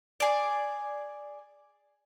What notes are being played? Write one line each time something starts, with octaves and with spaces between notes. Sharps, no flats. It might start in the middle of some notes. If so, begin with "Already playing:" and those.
G#4 D5